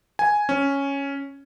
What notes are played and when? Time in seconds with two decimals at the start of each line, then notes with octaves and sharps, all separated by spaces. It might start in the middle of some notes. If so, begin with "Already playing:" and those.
0.19 G#5
0.49 C#4